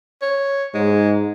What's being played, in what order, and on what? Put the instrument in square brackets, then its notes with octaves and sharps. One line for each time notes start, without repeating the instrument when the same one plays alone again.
[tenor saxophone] C#5
[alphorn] G#2 [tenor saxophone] G#3